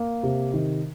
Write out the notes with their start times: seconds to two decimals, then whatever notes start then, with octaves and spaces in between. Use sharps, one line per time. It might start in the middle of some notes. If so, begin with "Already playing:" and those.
Already playing: A#3
0.23 C3
0.54 D#3